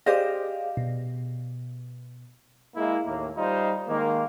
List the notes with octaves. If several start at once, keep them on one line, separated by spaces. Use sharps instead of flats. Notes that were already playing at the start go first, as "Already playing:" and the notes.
G4 G#4 C5 D5 D#5 F5
B2
G#3 A#3 E4
D#2 A2 A#3
G3 D#4 F4 C5
D#3 G#3 A#3